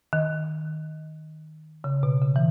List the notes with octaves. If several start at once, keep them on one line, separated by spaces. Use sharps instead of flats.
D#3
C#3
B2
C#3
E3